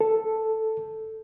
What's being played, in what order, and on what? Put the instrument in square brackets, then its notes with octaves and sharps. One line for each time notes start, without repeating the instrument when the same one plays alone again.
[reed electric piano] A4